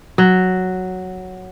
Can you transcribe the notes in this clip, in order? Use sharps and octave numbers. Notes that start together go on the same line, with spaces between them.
F#3